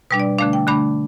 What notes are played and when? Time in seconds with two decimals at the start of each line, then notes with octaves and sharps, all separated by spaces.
0.11 B2 G3 D4 B4
0.20 D5
0.38 D3 A3 D4 F5
0.53 G5
0.67 D3 A3 D4 B5